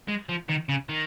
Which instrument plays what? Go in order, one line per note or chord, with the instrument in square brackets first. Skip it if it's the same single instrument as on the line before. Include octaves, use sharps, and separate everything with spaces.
[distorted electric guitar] G#3
F3
D#3
C#3
D#3